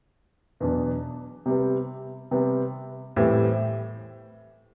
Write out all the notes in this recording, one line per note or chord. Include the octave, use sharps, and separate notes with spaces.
E2 B2 F#3 B3 D4
C3 G3 B3
C3 G3 B3
A2 E3 G3 C4